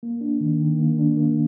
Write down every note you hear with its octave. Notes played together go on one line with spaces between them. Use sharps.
A#3
D4
D#3
D#3
A#3
D4
A#3